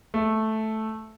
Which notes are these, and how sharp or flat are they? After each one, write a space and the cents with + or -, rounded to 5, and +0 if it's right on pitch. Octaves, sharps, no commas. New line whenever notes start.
A3 -5